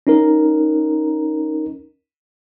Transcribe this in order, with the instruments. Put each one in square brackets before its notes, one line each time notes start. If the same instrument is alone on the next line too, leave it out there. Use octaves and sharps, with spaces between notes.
[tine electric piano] C#4 D#4 A#4